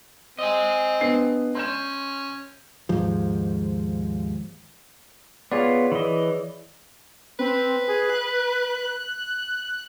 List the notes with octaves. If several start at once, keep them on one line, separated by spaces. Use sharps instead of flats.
C4 D#5 G#5
B3 D4 C7
C#4 C6 G6 E7
D#2 G#2 F3
B3 F4 G#4 C#5 D5
E3 D#5
C4 B4
G#4
F#6